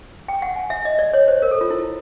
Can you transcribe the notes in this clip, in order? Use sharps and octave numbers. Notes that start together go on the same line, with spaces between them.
G5
F#5
G#5
E5
D#5
D5
C#5
C5
A#4
A4
F4
E4